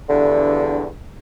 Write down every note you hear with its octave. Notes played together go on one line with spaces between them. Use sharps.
E2 G2 D3